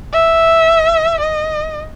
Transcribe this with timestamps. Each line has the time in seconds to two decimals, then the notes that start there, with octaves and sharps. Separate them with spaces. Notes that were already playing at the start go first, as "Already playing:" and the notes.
0.12 E5
1.20 D#5